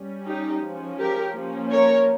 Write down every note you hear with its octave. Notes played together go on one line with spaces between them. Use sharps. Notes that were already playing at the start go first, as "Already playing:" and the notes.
Already playing: G3 C#4
D#4 G4
F3 G#3 C#4
G4 A#4
F3 A#3 C#4
A#4 C#5